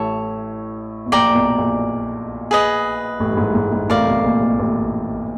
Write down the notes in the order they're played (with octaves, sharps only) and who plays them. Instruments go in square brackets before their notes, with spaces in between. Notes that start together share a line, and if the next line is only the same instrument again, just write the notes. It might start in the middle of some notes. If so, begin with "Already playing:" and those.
Already playing: [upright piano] A1 A2 [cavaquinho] C#5 E5 A5
[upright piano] B2
[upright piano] A#1 A#2 [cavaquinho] D5 G5 A#5
[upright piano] A#2
B1 B2
A#1 A#2
[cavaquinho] G#4 B4 D#5
[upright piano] A1 A2
G2
G#2
G#2
G#2
[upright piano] A1 A2 [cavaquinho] A#4 D5 F5
[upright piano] C3
B1 B2
A#1 A#2
A#1 A#2
A1 A2